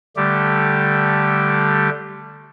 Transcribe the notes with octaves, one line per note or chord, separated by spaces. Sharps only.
D3 G3 A3 G4